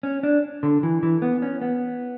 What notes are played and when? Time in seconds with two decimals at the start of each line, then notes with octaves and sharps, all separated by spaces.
0.03 C#4
0.23 D4
0.63 D3
0.83 E3
1.03 E3
1.22 B3
1.42 C#4
1.62 B3